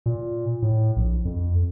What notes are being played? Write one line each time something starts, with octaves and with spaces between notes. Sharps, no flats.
A#2
A2
A#1
F2